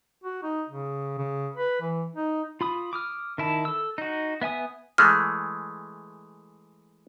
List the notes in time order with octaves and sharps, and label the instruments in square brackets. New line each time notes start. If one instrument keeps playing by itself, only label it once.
[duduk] F#4
D#4
C#3
C#3
B4
E3
D#4
[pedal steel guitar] F4 B5 D#6
D6 D#6 F6
D#3 E4 A5
A4 E6
D#4 F#4
B3 E5 G#5 D#6
[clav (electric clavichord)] E3 G#3 A3 [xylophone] F6 F#6